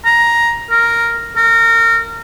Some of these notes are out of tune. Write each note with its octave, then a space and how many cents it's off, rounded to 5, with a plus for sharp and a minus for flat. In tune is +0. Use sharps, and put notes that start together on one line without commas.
A#5 +10
A#4 -5
A#4 -25